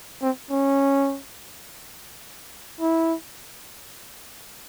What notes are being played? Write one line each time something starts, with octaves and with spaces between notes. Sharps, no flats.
C4
C#4
E4